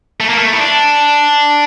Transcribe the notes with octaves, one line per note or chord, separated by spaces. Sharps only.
A3
A#3
A3
E4
D4